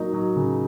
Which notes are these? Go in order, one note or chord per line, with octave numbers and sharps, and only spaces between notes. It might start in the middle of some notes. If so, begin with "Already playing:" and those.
Already playing: F#3 A#3 D#4
F#3
C#3